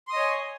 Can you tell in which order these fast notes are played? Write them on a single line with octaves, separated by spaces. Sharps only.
C6 D#6 D#5 C#5 G#5